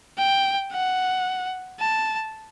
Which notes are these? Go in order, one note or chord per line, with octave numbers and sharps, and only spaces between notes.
G5
F#5
A5